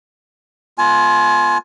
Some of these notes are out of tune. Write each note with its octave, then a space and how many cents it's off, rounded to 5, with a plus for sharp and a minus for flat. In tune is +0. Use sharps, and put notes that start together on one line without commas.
B3 +0 F4 +5 G#5 +30